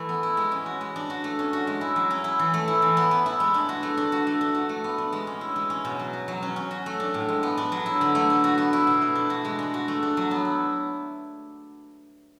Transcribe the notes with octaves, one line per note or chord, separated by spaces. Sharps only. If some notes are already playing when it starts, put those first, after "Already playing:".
Already playing: E3 A3
B3
E4
G#3
C#4
F#4
G#3
D4
F#4
A3
C#4
F#4
G#3
E4
F#3
C#4
E4
E3
A3
E4
E3
B3
B3
E4
G#3
D4
F#4
A3
D4
F#4
A3
D4
F#4
A3
B3
D4
G#3
C#4
E4
G#3
C#4
B2
F#3
F#4
F#3
C#4
C#4
F#4
A3
D4
A2
G#3
B3
D4
F#3
E4
D3
A3
D4
F#4
B3
E4
B2
A3
D4
F#4
G#3
D4
F#4
A3
D4
F#3
B3
E4